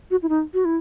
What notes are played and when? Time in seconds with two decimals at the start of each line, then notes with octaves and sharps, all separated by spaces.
0.11 F#4
0.23 E4
0.29 D#4
0.54 F#4
0.65 E4